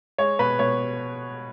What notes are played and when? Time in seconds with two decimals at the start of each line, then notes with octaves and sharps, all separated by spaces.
0.18 G#3 C#5
0.39 B2 B4
0.59 B2 C#5